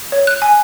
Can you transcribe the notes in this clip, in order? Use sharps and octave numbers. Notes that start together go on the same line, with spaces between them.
C#5
F#6
G#5